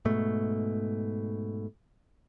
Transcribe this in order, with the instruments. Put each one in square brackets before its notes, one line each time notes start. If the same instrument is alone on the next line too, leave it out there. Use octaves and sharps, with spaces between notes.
[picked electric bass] G#2 B2 A3